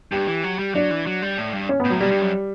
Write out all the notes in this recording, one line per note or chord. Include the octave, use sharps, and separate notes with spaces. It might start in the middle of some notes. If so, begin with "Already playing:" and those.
G2 G4
E3
F#3
G3
F#3 D4
E3
F#3
G3
A2
G2
C#4
B3
A2
F#3
B2 G3
G2
F#2